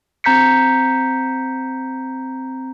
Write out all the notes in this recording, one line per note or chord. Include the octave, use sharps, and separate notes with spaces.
C4 A#5 G6 B6 C#7